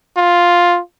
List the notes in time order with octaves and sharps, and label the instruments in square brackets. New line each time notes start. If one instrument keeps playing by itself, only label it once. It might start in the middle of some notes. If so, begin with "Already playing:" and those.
[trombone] F4